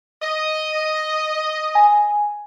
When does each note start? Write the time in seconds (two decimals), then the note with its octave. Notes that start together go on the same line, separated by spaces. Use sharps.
0.22 D#5
1.75 G#5